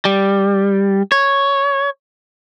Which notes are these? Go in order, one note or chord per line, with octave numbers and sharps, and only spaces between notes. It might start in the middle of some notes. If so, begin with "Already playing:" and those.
G3
C#5